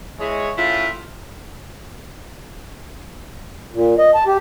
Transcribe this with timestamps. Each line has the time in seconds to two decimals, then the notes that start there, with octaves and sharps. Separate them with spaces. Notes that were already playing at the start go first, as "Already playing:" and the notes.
0.19 E3 G#3 E4 G#4 C#5
0.56 A2 C#3 E4 F4
3.73 A#2
3.99 D#5
4.15 A5
4.27 G4